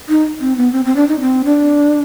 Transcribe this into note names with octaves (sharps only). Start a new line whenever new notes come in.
D#4
C4
B3
C4
C4
D4
D#4
C4
D4